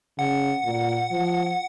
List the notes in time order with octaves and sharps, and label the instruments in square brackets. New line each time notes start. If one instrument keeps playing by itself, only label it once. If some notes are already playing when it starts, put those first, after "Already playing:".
[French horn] C#3 [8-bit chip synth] F#5
[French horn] A#2
F3